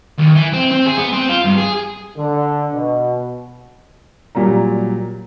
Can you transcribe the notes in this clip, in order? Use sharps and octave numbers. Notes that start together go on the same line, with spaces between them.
D#2
E3
C4
C4
G#4
B3
C4
F4
G2
G#4
D3
B2
A#2 F#3 G3 A#5